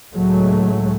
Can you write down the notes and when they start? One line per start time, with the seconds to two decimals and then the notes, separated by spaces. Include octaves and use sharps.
0.14 C#2 A2 F#3 G#3 A3